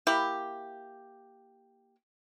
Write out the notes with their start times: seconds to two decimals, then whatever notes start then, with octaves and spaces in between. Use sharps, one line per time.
0.07 A#3 E4 G4